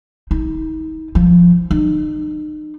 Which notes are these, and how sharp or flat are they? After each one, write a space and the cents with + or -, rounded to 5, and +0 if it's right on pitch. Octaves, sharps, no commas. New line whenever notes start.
D#4 +35
F3 +0
D#4 -35